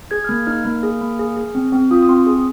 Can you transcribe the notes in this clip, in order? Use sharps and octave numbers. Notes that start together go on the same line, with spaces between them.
G#4 G#6
F6
A#3 G#6
D#4 F6
A#3
G#4
A#3
G#4
G#4
C4
C4
F4 D#6
D#6
C4 C6
G#4 D#6